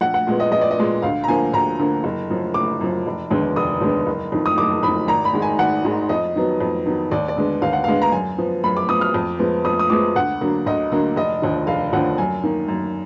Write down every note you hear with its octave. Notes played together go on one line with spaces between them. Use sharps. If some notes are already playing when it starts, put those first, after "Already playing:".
A#1 F#5
F#5
A#2 G#3 B3
D#5
A#1 D#5
D5
D#5
A#2 G#3 B3
D2 F5
A#5
D3 F3 A#3 G#5
D2 A#5
D3 F3 A#3
F#1
F#2 F3
F#1 D6
F#2 F3
F1
D#2 D3 G#3 B3
F1 D#6
D#2 D3 G#3 B3
F#1
F2 D#3
D#6
F#1 D6
F2 D#3 B5
G#1 A#5
B5
G#2 D#3 G#3
G#5
G#1 F#5
G#2 D#3 G#3
F2 D#5
D#3 F#3 B3
F2
D#3 F#3 B3
D#2 D5
D5
D3 G#3 B3
D#2 F5
F#5
D3 G#3 B3 F5
A#5
F#2 G#5
F3 B3
F#2 B5
D6
F3 B3 D#6
F6
F2
F3 G#3 B3
F2 D#6
D#6
F3 G#3 B3 D6
D2 F#5
D3 F#3 A#3
D2 D#5
D3 F#3 A#3
F1 D#5
D#2 D3 F3
F1 F5
D#2 D3 F3 F#5
F#2 G#5
D#3 A#3
F#2